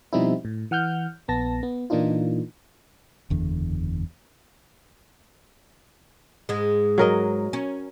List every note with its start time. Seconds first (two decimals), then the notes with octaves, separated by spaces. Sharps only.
0.13 B2 F3 G3 C4 D#4 E4
0.45 A2
0.71 E3 F#5 F6 G6
1.28 A#1 B3 A5 A#6
1.63 B3
1.90 A#2 E3 A#3 D4 D#4 F4
3.30 F#1 E2 D3
6.49 G#2 G#3
6.98 F#3 A#4 D#5
7.53 C#4